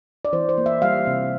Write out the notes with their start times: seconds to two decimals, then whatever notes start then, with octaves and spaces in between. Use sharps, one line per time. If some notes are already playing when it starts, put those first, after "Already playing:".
0.25 D5
0.33 E3 C5
0.49 C5
0.58 A#3
0.66 E5
0.82 G3 F5
1.07 C3